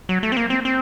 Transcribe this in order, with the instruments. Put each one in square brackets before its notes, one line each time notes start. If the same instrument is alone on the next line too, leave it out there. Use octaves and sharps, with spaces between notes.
[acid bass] F#3
A3
C4
A#3
C4
C4